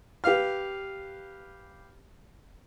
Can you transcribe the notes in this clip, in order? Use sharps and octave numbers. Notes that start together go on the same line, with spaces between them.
G4 B4 F5 F6